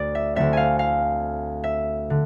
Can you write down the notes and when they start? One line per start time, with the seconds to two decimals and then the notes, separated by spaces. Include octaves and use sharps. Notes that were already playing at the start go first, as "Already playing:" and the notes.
Already playing: D2 D3 D5
0.15 E5
0.35 D2 D3 A3 C4 E5
0.53 F5 G#5
0.79 F5
1.64 E5
2.10 D3